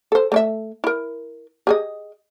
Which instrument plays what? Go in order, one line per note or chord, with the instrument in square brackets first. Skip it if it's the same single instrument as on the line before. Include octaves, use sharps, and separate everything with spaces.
[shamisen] A4 C5
A3 D5 E5
E4 A#4
G4 G#4 D#5